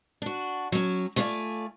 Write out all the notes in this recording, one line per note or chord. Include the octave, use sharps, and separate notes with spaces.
D4 F#4
F#3 C#4
A3 B3 F4 C#5 D5 G#5